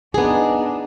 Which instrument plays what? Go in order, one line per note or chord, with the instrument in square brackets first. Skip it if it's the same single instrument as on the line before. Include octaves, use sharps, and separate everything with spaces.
[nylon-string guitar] B3 G#4 [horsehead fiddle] D4 D#4